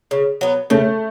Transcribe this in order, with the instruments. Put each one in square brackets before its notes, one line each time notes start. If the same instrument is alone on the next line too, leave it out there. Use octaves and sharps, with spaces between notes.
[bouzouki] C#3
F#3 B3
[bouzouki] C#3 [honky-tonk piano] A3